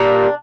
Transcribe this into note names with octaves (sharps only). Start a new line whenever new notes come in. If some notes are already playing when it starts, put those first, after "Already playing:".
Already playing: A#2 G3 A#3 D4